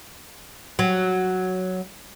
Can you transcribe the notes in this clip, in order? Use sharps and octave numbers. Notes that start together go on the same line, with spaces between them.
F#3